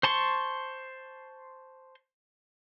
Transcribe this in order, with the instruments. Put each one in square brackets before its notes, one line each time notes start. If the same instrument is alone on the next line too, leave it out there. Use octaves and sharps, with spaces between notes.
[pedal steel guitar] C5 A5 C6 C#6